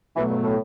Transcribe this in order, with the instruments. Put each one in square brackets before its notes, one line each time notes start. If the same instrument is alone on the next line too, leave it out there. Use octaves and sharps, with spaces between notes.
[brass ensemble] B2 F#3 A3 [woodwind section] E3
[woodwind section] G2
A2